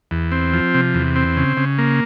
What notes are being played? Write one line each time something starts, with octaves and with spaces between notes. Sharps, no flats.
E2
C4
F3
C3
E2
C4
C#3
C#3
A#3